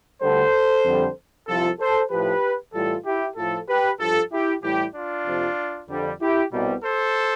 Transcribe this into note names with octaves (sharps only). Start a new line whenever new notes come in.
D2 D3 G3 A4 C5
F2 D3 G3
C2 C3 F3 F4 A4
A4 C5
A2 F3 G4 B4
A2 E3 G3 F4 A4
E4 G4
A2 F3 F4 A4
G4 B4
G2 F3 F4 A4
E4 G4
A2 E3 G3 E4 G4
D4 F4
F2 C3 F3
F2 D3 G3
E4 G4
C2 B2 G3
A4 C5